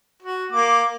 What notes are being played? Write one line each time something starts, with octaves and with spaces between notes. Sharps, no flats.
F#4
A#3 D6